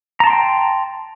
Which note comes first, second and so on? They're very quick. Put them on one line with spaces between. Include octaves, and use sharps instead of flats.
A#5 A5 C6 G5